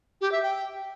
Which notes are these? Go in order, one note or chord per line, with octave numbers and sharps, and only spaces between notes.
G4
E5
G5